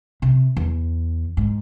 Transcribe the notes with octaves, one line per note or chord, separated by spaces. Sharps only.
C3
E2
G#2